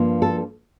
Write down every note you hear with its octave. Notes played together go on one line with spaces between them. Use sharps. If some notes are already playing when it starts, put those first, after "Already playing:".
Already playing: G2 F3 A#3
A4